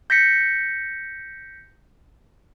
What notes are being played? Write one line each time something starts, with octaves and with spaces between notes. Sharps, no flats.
G6 A#6 B6 C#7